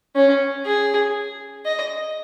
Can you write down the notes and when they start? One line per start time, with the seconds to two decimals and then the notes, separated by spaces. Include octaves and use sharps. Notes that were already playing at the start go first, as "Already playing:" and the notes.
0.15 C#4
0.66 G#4
1.66 D#5